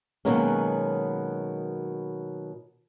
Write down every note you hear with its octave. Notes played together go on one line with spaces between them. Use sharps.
B2 D#3 F#3 G#3 A#3 C#4